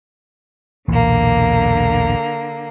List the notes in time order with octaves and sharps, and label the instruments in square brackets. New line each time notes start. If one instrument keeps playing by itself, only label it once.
[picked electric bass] B1 E2 A#2 [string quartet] D3 A#3